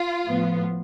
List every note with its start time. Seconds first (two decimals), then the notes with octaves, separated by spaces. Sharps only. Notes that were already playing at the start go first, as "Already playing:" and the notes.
Already playing: F4
0.27 A2 F3 B3